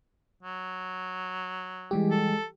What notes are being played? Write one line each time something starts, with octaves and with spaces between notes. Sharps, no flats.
F#3
E3 G3 G#3 G4
A4